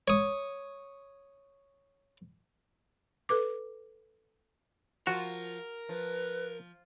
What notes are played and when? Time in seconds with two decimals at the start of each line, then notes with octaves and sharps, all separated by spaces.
0.08 C#5 D#6
3.29 A4 B4 D6
5.07 F3 F4 F#4 A#4
5.89 F3 B4